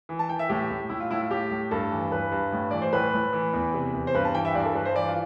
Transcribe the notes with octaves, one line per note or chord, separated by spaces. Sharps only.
E3
A5
E3 G5
E5
A2 G4
A2
A2 E4
F4
A2 E4
F4
A2 G4
A2
G2 A4
E3
G2 B4
G2
A2
E3 D5
C5
A2 B4
A2
E3
E2
C3
E2
C5
G2 B4
A5
E3 G5
E5
G2 D5
A4
G2 B4
C5
E3 D5
F4